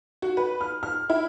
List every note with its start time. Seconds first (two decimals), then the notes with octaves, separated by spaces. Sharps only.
0.22 F#4
0.37 B4
0.61 F6
0.83 F6
1.10 E4